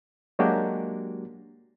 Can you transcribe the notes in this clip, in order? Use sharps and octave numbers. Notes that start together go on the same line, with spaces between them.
F#3 G#3 A#3 D4 F#4 G4